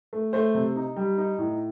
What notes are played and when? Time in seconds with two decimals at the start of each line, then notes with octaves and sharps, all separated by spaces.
0.13 A3
0.33 A3 C5
0.55 C3
0.76 D#4
0.96 G3
1.18 D#4
1.38 A2